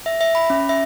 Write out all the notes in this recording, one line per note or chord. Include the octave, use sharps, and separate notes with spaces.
E5
E5
B5
C#4
E5